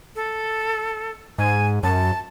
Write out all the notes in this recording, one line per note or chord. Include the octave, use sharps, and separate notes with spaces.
A4
G#2 G#5
F#2 A5